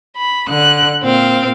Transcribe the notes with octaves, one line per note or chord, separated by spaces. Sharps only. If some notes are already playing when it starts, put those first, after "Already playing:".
B5
D3 F#6
A#2 C4 F5